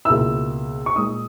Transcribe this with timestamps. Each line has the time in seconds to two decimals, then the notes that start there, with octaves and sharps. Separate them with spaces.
0.05 C#2 B2 A#3 E4 E6
0.86 C#6
0.96 A#2 G#3 D#4 D#6